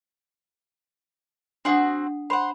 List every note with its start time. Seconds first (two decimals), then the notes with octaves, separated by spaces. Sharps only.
1.65 C4 D4 F#4 F#5 D#6
2.30 C5 F#5 B5